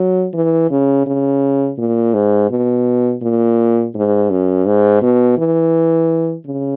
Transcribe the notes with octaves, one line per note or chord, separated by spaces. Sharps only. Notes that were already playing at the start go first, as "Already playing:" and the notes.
Already playing: F#3
E3
C#3
C#3
A#2
G#2
B2
A#2
G#2
F#2
G#2
B2
E3
C#3